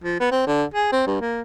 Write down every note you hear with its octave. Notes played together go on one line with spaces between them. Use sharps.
F3
B3
C4
D3
G#4
C4
G2
A#3